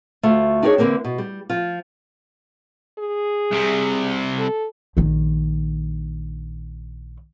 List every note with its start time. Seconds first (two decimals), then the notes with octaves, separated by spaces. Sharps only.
0.23 D2 A3 F4
0.63 D4 D#4 G4 G#4 C5 C#5
0.78 D3 E3 A#3 C4
1.04 B2
1.18 G3
1.49 F3 F4
2.99 G#4
3.51 C2 C3
4.38 A4
4.97 A#1 D#3